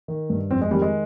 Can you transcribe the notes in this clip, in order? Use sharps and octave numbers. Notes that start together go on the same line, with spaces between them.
D#3
G2
F2 C4
G#3
D#3 G3
G#3